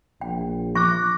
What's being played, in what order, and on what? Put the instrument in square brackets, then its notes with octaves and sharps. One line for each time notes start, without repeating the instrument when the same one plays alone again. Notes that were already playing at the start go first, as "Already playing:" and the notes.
[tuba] A#1 [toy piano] G5
[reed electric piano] F3 [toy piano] C#6 [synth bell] D6 F#6 A#6